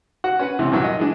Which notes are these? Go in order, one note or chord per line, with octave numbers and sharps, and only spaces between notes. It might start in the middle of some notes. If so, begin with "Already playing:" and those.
F#4 F#5
C#4 B4 F#5
C#2 C3 E3
G2 A#2 E3 F#3
D#5
E3 G#3 D4